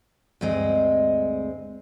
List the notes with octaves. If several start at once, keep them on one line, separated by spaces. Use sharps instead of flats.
D2 G2 G#3 C4 D#5